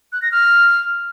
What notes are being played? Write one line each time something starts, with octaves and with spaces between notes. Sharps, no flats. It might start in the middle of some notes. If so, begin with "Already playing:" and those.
F#6
A#6
F6